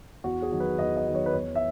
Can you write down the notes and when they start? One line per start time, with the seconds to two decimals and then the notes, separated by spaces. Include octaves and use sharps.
0.24 E2 F#4
0.42 G#4
0.51 D#3 F#3
0.60 B4
0.78 E2 D#5
0.96 D#5
1.06 D#3 F#3
1.15 C#5
1.26 B4
1.33 E2 C#5
1.55 E5